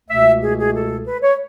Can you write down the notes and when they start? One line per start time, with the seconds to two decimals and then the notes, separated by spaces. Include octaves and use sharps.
0.09 C#2 B2 A3 E5
0.42 G#4
0.58 G#4
0.74 A4
1.06 B4
1.22 C#5